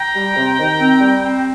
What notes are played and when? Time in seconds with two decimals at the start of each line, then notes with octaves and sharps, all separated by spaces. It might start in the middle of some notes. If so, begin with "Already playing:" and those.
Already playing: G5 A#5
0.15 G3
0.36 C3
0.58 D#3
0.79 C4
1.00 G3
1.22 C4